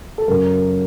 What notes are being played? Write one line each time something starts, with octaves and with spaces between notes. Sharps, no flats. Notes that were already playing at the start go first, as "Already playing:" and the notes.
A4
F#2 C#3 A#4